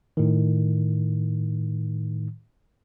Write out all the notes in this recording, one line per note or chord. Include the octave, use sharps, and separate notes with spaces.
A2 D#3